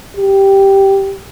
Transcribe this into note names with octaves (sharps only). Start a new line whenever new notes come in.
G4